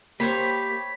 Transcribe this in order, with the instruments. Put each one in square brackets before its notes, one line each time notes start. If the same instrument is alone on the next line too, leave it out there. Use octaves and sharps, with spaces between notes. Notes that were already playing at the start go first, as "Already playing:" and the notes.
[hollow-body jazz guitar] A#3 [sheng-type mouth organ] G4 [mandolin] C5 C#5 B5 [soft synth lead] B6